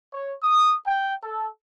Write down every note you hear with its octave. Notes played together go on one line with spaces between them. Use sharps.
C#5
D#6
G5
A4